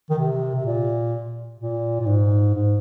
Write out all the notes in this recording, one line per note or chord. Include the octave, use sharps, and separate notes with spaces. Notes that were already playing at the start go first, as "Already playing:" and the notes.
D#3
C3
C3
A#2
A#2
A#2
G#2
G#2